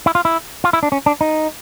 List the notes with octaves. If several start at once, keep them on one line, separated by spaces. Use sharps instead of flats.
E4
F4
E4
F4
E4
D4
C#4
D4
D#4